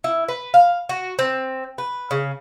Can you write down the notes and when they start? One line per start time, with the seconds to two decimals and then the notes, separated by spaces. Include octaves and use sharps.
0.04 E4
0.28 B4
0.54 F5
0.89 F#4
1.19 C4
1.78 B4
2.11 C#3